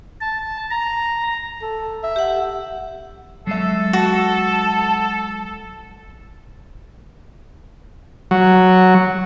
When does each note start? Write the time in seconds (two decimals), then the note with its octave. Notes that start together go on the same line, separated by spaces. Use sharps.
0.21 A5
0.70 A#5
1.62 A4
2.04 E5
2.16 G4 F#5
3.47 F#3 G#3 A4 E5
3.93 F#4 A5
8.31 F#3